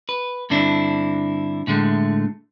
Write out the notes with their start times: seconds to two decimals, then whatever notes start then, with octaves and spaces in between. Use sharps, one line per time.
0.09 B4
0.50 G2 D3 C4 D4 E4
1.67 A2 D3 G#3 A3